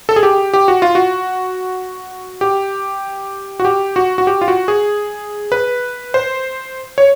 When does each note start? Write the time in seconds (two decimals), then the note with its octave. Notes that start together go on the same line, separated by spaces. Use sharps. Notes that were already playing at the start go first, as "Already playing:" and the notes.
0.09 A4
0.16 G#4
0.23 G4
0.54 G4
0.68 F#4
0.82 F4
0.95 F#4
2.41 G4
3.60 F#4
3.65 G4
3.96 F#4
4.18 F#4
4.27 G4
4.41 F4
4.48 F#4
4.68 G#4
5.52 B4
6.14 C5
6.98 C#5